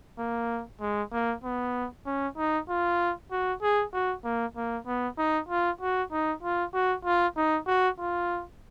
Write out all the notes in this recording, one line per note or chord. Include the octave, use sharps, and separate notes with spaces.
A#3
G#3
A#3
B3
C#4
D#4
F4
F#4
G#4
F#4
A#3
A#3
B3
D#4
F4
F#4
D#4
F4
F#4
F4
D#4
F#4
F4